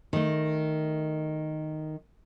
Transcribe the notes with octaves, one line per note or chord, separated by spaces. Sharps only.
D#3 A3